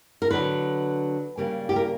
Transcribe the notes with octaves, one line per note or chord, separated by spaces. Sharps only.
A#4
D3 F#3 B3 B4
C#3 G3 A#3
G4
A#4